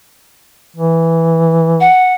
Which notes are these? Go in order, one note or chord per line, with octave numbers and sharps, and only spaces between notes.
E3
F#5